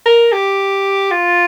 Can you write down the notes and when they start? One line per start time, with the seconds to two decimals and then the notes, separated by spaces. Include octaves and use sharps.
0.06 A#4
0.32 G4
1.11 F4